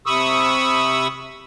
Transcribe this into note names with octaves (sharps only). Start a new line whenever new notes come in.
C3 B5 C#6 D#6 E6